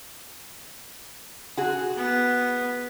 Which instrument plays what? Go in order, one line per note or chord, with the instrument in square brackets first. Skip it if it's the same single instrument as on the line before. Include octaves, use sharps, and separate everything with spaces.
[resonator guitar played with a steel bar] F#4 G#4
[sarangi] B3